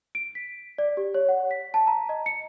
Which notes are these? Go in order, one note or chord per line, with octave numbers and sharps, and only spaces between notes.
D7
B6
D5
G4
C#5
F#5
B6
A5
A#5
D#5
C#7